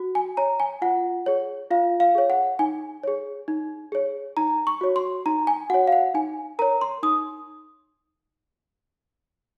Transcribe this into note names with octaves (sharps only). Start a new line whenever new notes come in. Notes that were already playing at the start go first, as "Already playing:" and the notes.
Already playing: F#4
G#5
C#5 A#5
G#5
F4 F#5
G#4 C#5
F4 F5
F5
G#4 C#5
F#5
D#4 G#5
G#4 C#5
D#4
G#4 C#5
D#4 A#5
C#6
F#4 C#5
C6
D#4 A#5
G#5
F#4 C#5 F#5
F5
F#5
D#4 G#5
A#4 C#5 A#5
C6
D#4 D#6